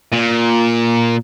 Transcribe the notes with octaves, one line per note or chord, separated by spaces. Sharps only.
A#2